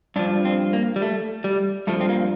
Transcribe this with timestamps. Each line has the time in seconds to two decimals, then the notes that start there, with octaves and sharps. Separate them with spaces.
0.16 G2 F3 D4
0.45 C4
0.73 A#3
0.96 G3
1.02 A3
1.44 G3
1.87 G2 F3 A3
2.01 C4
2.09 A#3